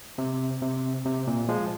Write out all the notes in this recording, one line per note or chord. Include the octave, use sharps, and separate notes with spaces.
C3
C3
C3
A#2
F3 G#3